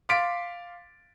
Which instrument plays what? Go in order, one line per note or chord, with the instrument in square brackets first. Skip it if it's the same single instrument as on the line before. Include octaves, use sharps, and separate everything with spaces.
[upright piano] F5 C6 D6 A6 B6 D7